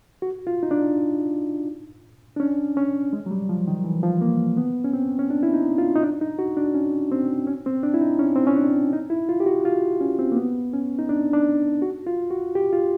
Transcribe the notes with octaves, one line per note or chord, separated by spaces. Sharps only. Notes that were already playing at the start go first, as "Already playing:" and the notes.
F#4
F4
D#4
D4
D4
C#4
C#4
G#3
F#3
G3
F3
D#3
E3
F3
A#3
B3
C#4
C4
C#4
D4
E4
D#4
F4
D#4
D4
D#4
F#4
D4
C#4
C4
C#4
C4
D4
E4
D#4
C#4
C4
C#4
D4
D#4
E4
F4
G4
F#4
F4
C#4
C4
A#3
B3
C#4
D#4
D4
D4
F#4
F4
F#4
G4
F4